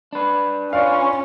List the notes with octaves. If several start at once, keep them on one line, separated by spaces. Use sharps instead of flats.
D4 B4
C#4 F4 D5 F5 C#6